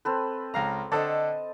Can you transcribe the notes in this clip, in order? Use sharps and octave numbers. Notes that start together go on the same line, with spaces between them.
C4 A4 B4
C#2 F5 A#5
D3 A4 C5 D#5 A5